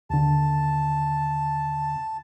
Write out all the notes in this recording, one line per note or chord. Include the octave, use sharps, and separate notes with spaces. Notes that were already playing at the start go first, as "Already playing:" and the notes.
D#2 D3 A5